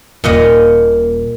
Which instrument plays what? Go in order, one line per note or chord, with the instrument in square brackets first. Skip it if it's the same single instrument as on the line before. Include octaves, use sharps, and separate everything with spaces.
[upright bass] D#1 [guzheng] A#2 D#5 F#5